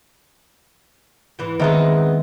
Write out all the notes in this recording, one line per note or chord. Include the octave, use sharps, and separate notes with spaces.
G#2 E3
D#3 G#3 B3 C4 E5 A#5